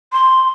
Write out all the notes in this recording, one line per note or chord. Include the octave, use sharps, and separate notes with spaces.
C6